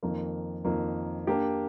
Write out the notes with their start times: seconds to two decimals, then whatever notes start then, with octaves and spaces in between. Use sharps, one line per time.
0.03 F2 D#3 A#3
0.65 F2 D#3 A#3
1.27 A#3 D4 G4